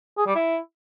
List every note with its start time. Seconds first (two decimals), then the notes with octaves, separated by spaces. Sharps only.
0.18 G#4
0.27 G3
0.35 E4